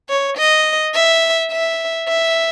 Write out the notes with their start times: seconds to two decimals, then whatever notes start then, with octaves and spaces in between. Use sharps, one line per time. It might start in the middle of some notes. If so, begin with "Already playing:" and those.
0.10 C#5
0.38 D#5
0.95 E5
1.51 E5
2.09 E5